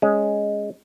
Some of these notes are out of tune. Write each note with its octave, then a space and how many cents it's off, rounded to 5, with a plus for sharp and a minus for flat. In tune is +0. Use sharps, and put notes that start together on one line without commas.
G#3 +0 C#4 +5